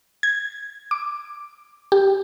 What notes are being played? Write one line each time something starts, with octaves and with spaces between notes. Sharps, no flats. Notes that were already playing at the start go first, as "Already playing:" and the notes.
G#6
D6
G4